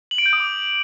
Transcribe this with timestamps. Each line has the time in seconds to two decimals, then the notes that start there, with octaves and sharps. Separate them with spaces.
0.11 F#7
0.18 D7
0.26 G6
0.33 D#6
0.40 D6